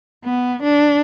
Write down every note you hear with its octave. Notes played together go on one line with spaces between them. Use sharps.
B3
D4